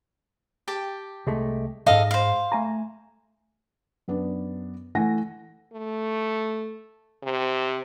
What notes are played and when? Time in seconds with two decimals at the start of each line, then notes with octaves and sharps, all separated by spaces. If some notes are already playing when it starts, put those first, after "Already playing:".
0.68 G4 G5 A5
1.27 C2 G#3 A3
1.86 B1 G#2 A4 D#5 F5
2.11 C5 F5
2.52 A3 G#5 A#5
4.08 F#2 B3 D4
4.95 E3 A3 F#5 G#5 A#6
5.73 A3
7.23 C3